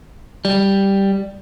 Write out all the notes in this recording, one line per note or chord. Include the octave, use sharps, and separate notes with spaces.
G3